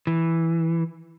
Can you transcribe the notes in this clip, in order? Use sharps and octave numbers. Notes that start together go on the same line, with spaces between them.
E3